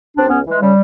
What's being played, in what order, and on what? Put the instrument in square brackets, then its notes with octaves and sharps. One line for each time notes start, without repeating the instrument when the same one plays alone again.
[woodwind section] C#2 C4 D4
C#2 B3 C#4
E3 G#3
C#3 G3